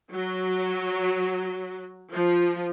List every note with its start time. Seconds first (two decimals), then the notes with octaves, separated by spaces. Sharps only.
0.12 F#3
2.12 F3